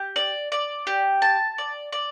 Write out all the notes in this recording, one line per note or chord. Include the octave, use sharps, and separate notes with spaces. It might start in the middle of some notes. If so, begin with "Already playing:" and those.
Already playing: G4
D5
D5
G4
A5
D5
D5